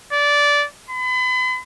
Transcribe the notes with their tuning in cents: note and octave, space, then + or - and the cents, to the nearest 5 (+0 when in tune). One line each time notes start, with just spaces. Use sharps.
D5 -15
B5 +40